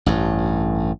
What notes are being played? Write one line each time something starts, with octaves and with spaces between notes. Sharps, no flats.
A1 G2